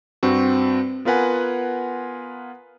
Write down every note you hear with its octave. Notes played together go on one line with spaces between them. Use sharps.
G2 C4 F#4
B3 F4 A#4 B4 F#5 G#5